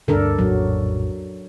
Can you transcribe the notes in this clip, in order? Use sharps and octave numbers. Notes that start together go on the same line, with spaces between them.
D2 G2 D3 D4 A4 A#4
A#1 F2 A2 F#3